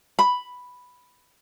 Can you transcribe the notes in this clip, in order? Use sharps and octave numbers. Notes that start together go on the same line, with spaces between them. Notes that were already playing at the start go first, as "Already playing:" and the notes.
B5